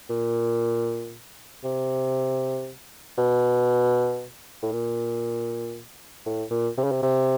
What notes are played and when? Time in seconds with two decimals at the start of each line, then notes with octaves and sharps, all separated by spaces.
0.10 A#2
1.64 C3
3.18 B2
4.62 A2
4.72 A#2
6.26 A2
6.51 A#2
6.77 C3
6.84 C#3
6.91 C3
7.03 C3